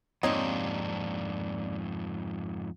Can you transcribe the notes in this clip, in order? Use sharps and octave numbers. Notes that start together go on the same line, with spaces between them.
F2 G#2 A#3 C4 D4 D#4 G4 C#5